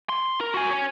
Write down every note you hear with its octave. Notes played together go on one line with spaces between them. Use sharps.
C6
A#4
F#4 G#5
C#5 G#5